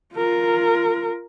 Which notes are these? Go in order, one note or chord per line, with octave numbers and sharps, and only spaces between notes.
F4 A#4